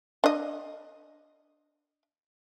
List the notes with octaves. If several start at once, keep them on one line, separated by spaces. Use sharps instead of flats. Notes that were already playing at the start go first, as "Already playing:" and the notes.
D4 D#5